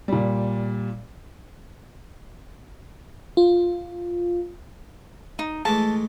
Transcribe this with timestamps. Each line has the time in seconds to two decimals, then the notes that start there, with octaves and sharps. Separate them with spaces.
0.08 A#2 G3
3.37 F4
5.39 D#4
5.65 E3 G#3 A3 A5